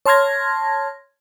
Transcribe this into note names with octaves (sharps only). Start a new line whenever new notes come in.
C#5 A5 C6 F6 G#6 A#6